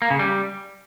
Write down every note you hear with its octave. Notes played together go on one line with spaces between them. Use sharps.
A#3
C#3
G3